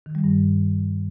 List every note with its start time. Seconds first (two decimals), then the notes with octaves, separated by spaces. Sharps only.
0.06 D#3
0.15 G3
0.24 G2